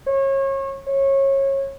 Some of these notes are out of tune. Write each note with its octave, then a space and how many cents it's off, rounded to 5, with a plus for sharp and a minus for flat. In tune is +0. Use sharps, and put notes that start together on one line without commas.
C#5 -30
C#5 -25